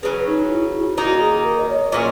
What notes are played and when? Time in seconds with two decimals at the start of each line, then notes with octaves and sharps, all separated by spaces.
0.03 C#3 F#3 C#4 B4
0.26 D#4
0.50 E4
0.74 E4
0.81 F#4
0.89 E4
0.97 D#3 A#3 D#4 F#4
1.20 G#4
1.44 A#4
1.59 D#5
1.69 C#5
1.91 A#2 F#3 C#4 G#4 D#5